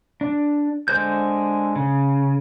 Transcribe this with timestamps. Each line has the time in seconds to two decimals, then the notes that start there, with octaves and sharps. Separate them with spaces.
0.21 D4
0.88 D3 G#3 C5 G6
1.76 C#3